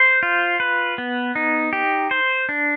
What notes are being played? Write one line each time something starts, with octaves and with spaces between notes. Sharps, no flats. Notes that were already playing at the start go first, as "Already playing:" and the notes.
Already playing: C5
F4
B4
B3
D#4
G4
C5
D4